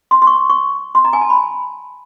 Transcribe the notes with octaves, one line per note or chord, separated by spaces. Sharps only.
C6
C6
C#6
C#6
C6
A#5
G#5
A5
B5